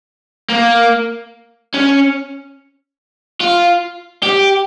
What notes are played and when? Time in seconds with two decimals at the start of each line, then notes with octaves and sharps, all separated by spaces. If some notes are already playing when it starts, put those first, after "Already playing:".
0.49 A#3
1.75 C#4
3.41 F4
4.23 G4